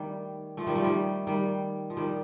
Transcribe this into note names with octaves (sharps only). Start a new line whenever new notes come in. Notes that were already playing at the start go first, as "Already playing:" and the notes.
Already playing: D#3 G3 A3
F3 A3
D#3 G3
F3 A3
D#3 G3
D#3 G3
F3
D#3 G3